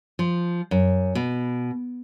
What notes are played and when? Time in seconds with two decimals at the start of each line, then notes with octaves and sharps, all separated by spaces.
0.19 F3
0.71 F#2
1.15 B2